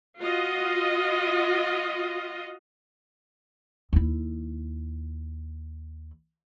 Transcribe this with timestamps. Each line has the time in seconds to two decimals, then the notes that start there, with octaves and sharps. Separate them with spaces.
0.20 F4 F#4 D#5
3.93 D#2 E4